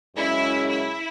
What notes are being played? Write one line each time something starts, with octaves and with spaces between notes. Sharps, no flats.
F#2 C#3 G#3 C#4 E4
E4